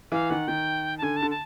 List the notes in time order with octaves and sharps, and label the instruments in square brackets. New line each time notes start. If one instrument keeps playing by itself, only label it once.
[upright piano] E3 [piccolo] F5
[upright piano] D#3 [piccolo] F#5
[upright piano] D#3 [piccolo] G5
[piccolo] A5
[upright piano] D3 [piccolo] G#5
[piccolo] A5
[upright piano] D3
[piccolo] A5